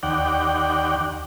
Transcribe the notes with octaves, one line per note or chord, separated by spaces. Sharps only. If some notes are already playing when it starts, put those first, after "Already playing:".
D#2 D5 F#5 G5